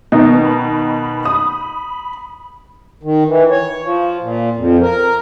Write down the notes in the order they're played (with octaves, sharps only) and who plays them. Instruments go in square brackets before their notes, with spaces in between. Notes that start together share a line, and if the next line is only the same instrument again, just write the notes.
[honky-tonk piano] B2 D#3 D#4 [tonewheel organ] B3
[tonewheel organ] B5
[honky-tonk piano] D#6
[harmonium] D#3
E3
C#5
F3
A#2
F2
A#4